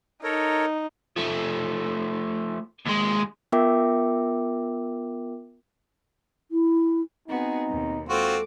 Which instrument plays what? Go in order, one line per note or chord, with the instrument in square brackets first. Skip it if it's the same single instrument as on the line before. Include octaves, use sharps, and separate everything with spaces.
[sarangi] D#4 [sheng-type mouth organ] A4 A#4 C#5
[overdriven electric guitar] F3 A3
D#2 G#3
[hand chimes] B3 F4 A#4 E5 G5 D6
[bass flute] E4
[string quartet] B3 F#4 G#4 [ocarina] C4 [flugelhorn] D#4
[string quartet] D#2 B2
[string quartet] G#3 D6 [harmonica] C4 F4 F#4 [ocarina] A4